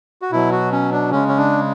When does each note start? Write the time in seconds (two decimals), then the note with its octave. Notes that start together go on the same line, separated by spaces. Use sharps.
0.22 F#4
0.32 B2 F#3 E4
0.52 F#4
0.72 C#4
0.92 D4
1.11 C#3 G#3 C#4
1.28 C#4
1.38 D4